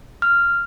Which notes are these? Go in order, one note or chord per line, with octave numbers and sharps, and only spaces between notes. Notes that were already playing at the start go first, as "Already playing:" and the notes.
F6